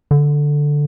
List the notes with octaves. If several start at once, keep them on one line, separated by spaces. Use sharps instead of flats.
D3